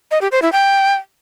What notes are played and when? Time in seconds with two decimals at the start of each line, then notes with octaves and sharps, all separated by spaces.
0.11 D#5
0.22 G4
0.32 C5
0.42 E4
0.52 G5